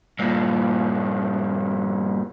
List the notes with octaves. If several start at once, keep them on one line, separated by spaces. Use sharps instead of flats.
G2 A#2